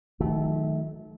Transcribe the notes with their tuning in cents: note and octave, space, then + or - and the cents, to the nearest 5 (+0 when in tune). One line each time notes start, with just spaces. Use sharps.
D#3 +0 F#3 -45 A3 -30